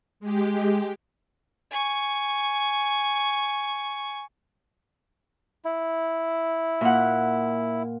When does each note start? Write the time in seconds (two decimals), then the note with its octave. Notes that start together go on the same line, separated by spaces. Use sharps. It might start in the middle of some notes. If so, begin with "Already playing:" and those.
0.20 G#3 G4
1.71 G#5 C#6
5.65 E4
6.81 A#2 F#5